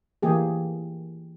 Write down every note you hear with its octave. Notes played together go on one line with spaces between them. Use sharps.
E3 A#3 G4 G#4